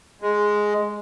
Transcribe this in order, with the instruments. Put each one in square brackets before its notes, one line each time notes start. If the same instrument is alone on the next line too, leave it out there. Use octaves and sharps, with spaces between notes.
[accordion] G#3